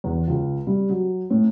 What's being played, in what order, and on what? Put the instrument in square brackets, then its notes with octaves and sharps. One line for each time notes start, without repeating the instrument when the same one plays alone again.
[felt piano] E2
C#2
G3
F#3
A2